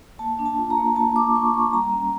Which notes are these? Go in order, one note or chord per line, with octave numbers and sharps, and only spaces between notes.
A#3 A5
D4
A5
F4
A#5
A#3
A#3 A5
D4 D6
F4 C#6
A#3 C#6
G3 A#5
C#4